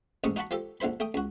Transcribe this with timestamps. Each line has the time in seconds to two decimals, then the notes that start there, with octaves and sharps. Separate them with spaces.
0.24 A1 D#2 G#2 C#6 D#6
0.36 D#4 F#4 F#5 A5 B5 C#6
0.51 F3 G4 A4
0.80 A#1 D3 E4 C5 B5
1.00 A3 G5 D#6
1.14 C#2 F#4